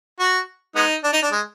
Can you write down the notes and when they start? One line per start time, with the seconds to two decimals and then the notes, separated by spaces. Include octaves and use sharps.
0.20 F#4
0.76 G#3 B3 D#4
1.04 D4
1.13 D#4
1.22 D4
1.32 G#3